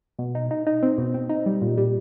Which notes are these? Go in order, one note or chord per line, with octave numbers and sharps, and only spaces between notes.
B2
D#4
D#4
D#4
C4
B2
C4
D#4
G3
A#2
G3